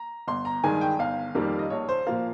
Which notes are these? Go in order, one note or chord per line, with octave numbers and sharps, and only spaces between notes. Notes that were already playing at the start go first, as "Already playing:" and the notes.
Already playing: A#5
G1 C6
A#5
G2 D#3 G#3 G#5
G5
G1 F5
F2 D#3 G3 A#3
D#5
A#1 C#5
C5
A#2 F3 A#3 F5